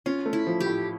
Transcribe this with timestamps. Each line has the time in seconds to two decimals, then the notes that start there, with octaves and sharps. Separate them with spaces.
0.06 C#4 F4
0.26 A3
0.33 E4
0.47 F3
0.61 G4
0.66 A2